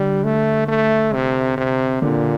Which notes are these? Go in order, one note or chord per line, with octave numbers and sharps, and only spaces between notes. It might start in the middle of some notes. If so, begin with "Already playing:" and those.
Already playing: D3 G3
A3
A3
C3
C3
A#2 D3